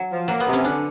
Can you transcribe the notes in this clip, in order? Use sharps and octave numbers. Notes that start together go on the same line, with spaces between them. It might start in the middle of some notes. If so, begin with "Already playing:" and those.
Already playing: F#3
F3
F#3 A#3
B3
C3
C#4
D3 D4